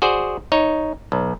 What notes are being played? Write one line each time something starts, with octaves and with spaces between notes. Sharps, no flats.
F#4 G#4 C5 D5
D#4 C#5
B1